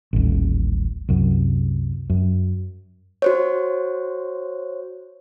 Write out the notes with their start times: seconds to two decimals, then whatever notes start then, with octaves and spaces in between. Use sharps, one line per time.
0.13 D#1 A1
1.09 C2 F#2
2.10 F#2
3.22 F#4 C5 C#5